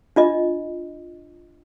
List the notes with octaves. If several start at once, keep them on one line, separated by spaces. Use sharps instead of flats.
D4 F4 D#5